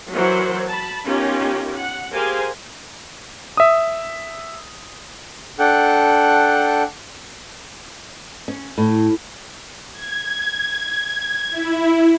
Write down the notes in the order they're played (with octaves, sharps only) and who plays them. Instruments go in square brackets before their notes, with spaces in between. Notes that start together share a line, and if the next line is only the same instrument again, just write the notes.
[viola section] E3 F#3 F#4 A#4 C5
A5 B5
B3 C#4 D#4 F4 G4 A#4
F#5
G4 G#4 A#4 C5 F5 G#5
[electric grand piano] E5 D#6
[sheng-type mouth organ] D4 A4 F#5 G5 F#6
[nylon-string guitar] C#4
A2
[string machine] G#6
E4